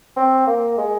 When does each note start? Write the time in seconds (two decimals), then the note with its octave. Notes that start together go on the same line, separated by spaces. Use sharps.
0.16 C4
0.47 A#3
0.78 G#3